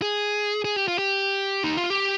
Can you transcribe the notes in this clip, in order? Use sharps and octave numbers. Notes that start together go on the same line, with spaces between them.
G#4
G#4
G4
F4
G4
D#4
F4
G4